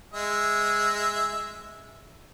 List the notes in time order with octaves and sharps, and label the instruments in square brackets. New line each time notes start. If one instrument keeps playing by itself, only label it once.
[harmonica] G#3 E5